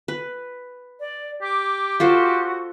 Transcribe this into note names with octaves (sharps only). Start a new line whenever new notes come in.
B4
D5
G4 D6
F4 F#4 A4 C5